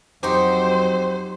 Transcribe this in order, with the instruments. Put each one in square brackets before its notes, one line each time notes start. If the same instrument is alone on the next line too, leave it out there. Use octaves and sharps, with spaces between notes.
[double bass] F2 F#3 [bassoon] C4 [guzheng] D#4 F#4 G4 [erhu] C5